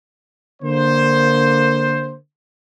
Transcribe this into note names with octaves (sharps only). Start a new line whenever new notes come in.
D3 A#3 C5